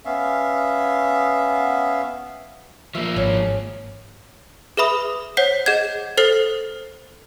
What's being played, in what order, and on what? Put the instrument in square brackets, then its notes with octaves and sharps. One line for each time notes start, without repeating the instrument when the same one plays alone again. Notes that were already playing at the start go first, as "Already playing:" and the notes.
[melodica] B3 C#4 E5 F5
[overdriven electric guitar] F3 A#3 [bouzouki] E5
[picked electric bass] G#1 [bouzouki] C#4
[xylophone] G#4 B4 E5 B5 D#6
C5 C#5 F#5 G6 B6 C7
G#4 D#5 F#5 G6 G#6
A4 C5 F6 A6 C7 F#7